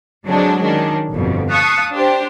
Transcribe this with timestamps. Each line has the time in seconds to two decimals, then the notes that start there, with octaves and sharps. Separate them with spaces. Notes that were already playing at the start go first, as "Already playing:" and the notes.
0.26 D3 F#3 G#3 C4 D4
0.61 D#3 C#4 D4
1.13 G1 F2 B2
1.50 F5 A5 C#6 D#6 F#6 B6
1.94 D4 G4 C5